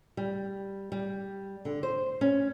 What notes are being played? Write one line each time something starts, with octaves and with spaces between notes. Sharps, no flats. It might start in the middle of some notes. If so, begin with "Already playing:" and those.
G3
G3
D3
C5
C#4